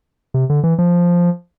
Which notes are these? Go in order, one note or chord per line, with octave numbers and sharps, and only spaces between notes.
C3
D3
E3
F3